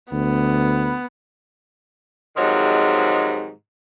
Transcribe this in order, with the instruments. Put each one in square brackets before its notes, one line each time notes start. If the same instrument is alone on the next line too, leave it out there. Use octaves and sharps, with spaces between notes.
[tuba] D2 [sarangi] B3
[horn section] G#2 C3 D#3 F3 F#3 G#3